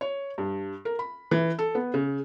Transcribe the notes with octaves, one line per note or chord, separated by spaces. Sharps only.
C#5
G2
A#4
B5
E3
A4
B3
C#3